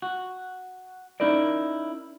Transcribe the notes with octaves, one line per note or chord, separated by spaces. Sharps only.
F#4
C#4 D#4 E4 A#4 D5